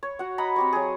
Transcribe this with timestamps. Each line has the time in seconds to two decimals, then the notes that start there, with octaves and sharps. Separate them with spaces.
0.03 C#5
0.19 F#4 F#5
0.38 D#5 F#5 A#5 B5
0.56 C4 G4 C#5
0.73 F#3 G#4